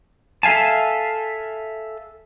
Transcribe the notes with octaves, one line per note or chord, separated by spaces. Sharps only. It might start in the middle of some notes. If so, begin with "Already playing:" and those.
A4 E5 F5 G#5 A5